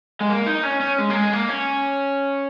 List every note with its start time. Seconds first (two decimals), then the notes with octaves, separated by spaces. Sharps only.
0.20 G#3
0.29 A#3
0.46 D#4
0.63 C#4
0.80 C#4
0.98 G#3
1.10 A#3
1.15 G#3
1.33 A#3
1.49 C#4